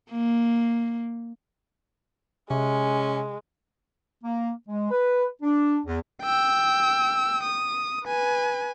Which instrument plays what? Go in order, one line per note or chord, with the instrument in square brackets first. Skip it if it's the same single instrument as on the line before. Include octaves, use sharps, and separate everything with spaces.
[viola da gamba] A#3
[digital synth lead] C3 [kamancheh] G#3 [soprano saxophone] C#4
[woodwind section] A#3
G#3
B4
D4
E2
[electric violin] G5 E6
D#6
B4 G#5